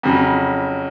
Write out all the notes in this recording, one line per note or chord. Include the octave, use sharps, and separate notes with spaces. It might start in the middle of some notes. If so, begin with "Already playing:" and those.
F2 C#3 F#3